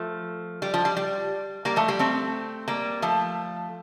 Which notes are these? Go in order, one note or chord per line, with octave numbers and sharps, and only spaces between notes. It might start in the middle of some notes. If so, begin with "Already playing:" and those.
Already playing: F3 A3
G3
F3
G3
G3
G3 A#3
F3 A3
G3
A3 C4
G3 A#3
F3 A3